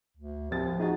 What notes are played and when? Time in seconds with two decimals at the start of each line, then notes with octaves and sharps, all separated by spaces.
0.17 D2
0.51 C2 F3 A6
0.80 D#4 F#4 G#4